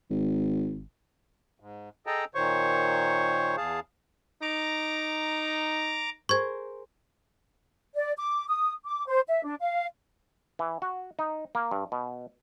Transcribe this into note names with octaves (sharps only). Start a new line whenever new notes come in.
G#1
G#2
G#4 A4 D#5 G5 A5 A#5
A#2 D#3 C5 C#5 C#6
E2 G#4 F5 A5
D#4 A#5 D6
G#4 A#4 C5 C#6 G#6
D5
D6
D#6
D6
C5
E5
D4
F5
E3
F#4
D#4
A#3
G2
B2